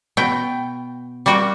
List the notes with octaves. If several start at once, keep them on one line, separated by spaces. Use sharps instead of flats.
B2 G5
G3 A#3 F#4 G5